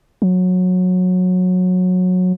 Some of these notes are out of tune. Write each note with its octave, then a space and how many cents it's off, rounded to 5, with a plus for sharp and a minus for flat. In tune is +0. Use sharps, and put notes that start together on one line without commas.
F#3 -20